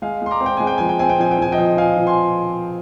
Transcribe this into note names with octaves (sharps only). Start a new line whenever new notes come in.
G#3 F5 G#5
G#3 C6
A#5 D6
C4
G5
G#3 G#5
G5
F3 G#5
G5
C4 G#5
G5
F3 G#5
G5
F3 G#5
D#5 G5
F3
F3 F5 G#5
F3
G#5 C6